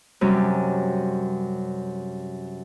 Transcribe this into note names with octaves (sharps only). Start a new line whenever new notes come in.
F#2 C3 G3 C#4